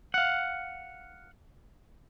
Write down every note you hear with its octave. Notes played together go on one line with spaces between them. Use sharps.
F5 F#5